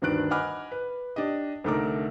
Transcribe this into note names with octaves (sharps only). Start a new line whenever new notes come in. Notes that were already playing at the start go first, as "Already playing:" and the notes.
D2 G2 D#3 D4 F#6 D7
D#5 F#5 G#5 B5 D6 F6
B4
D4 G4 D#5
C2 D3 A3 D#4 A#4 D6